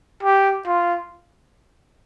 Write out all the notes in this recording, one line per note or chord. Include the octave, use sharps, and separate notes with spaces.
G4
F4